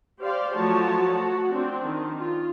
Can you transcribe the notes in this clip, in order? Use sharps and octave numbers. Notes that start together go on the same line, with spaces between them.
G4 C5 D5 F5
F3 F#3 A3 F#4 C#5 A5
F#4
C4 D4
D#3
F4